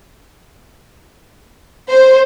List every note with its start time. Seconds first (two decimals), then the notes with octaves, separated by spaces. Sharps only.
1.88 C5